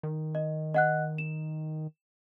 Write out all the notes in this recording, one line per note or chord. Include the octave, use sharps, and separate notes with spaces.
D#3
D#5
D#5 F#5 F#6
E7